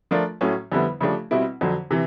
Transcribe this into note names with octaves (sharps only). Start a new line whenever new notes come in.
F3 A3 D4 F4 A#4
A2 F#3 A3 C#4
F2 D3 G3 B3 E4
C#3 F3 A3 D4 G4
B2 G3 C4 E4
F2 D3 F#3
C3 E3